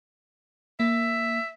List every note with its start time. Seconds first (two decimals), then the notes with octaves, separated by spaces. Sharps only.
0.80 A#3 E5